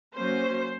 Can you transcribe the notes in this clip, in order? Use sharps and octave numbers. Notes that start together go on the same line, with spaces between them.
F#3 A#3 C#4 C5